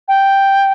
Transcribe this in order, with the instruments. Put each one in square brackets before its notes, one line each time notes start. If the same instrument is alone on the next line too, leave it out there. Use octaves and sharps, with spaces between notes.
[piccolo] G5